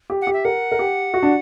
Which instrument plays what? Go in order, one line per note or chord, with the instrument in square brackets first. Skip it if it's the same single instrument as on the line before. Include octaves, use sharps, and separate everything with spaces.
[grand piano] G4
[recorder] F#5
[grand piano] G4
[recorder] E5
[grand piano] A#4 [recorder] F#5
[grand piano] A#4
G4
F#4
D4